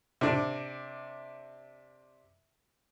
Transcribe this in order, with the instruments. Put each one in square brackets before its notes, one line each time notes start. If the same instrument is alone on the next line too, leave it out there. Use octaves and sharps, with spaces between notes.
[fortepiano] C3 D4